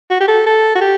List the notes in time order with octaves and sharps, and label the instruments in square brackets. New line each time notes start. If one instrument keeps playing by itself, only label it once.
[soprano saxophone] F#4
G4
A4
A4
F#4
G4